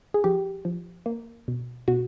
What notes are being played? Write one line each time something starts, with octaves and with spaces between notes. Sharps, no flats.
G#4
F3 G4
F3
A#3
B2
B2 F#4